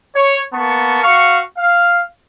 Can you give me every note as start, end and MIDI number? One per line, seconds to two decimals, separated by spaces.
0.15 0.40 73
0.54 1.02 58
0.54 1.02 59
0.54 1.02 81
0.54 1.02 85
1.04 1.40 66
1.04 1.40 77
1.04 1.40 85
1.58 2.02 77